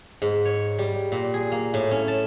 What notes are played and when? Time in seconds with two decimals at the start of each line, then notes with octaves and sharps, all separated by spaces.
0.22 G#2
0.45 C#5
0.78 G3
1.12 A#2
1.34 G#4
1.52 A#3
1.74 A2
1.91 C#4
2.08 A5